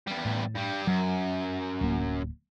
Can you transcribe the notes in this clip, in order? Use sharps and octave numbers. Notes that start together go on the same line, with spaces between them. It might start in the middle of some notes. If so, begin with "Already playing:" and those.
E2 G3
A2
G2 G3
F#2 F#3
D1 A#3